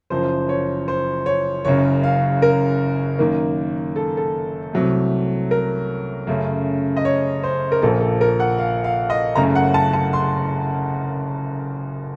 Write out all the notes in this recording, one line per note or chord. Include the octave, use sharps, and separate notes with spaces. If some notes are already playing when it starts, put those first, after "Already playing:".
F#1 F#2 F3 C5
C#5
C5
C#5
F#1 F#2 C#3 C#5
F5
A#4
F#2 D#3 A#3
A4
A4
C2 C3 F#3 A3
A#4
F#2 C#3 A3
D#5
C#5
C5
A#4
A#1 A#2 F3 A#3 A4
A4
A#4
F#5
F5
F5
D#5
F#1 F#2 C#3 A3 A#5
F#5
A5
A5
C6